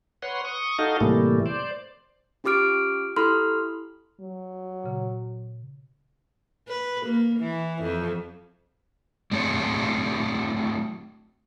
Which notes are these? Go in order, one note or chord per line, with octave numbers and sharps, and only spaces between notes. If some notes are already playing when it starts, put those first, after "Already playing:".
B4 C#5 F#5 C6
C#6 D#6
D#4 F#4 A4 D#5 F5
A2 C3 E3 G3 A3 A#3
C5 D5
C#4 F4 G4 D6 F6 D7
E4 G4 A4 B5 C6 F6
F#3
A#2 C#3
B4
A#3
E3
F2
F#3 A3 C4 D4 G#4 C#5